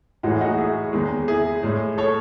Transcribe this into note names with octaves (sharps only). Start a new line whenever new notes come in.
A2 E3 G#3 D#4 F#4
D#4 F#4
E4 G#4
E2 D#3 G#3
E4 G#4
A2 G#3
A4 C#5